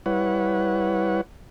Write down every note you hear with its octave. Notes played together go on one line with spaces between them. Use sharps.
G3 E4 B4 C#5 F#5